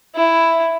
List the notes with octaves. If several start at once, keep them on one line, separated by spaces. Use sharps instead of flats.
E4